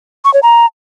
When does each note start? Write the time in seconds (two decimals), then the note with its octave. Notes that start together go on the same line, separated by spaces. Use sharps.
0.25 C#6
0.34 C#5
0.43 A#5